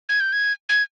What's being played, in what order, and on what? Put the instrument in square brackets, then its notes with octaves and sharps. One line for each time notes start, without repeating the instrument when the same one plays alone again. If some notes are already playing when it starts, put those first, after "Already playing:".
[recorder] G#6
G6
G#6
G#6